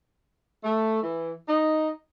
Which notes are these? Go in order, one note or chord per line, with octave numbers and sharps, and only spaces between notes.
A3
E3
D#4